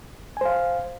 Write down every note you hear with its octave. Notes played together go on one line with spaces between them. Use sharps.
C5 F5 G#5